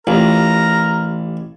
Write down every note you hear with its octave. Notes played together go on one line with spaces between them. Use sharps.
A1 F4 G4 A#4 A5 A#5